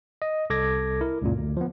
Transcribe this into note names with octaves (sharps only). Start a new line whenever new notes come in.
D#5
C2 A4 D6 G#6 A#6
E4 A#4
C#2 F#2 A#2
D2
F3 B3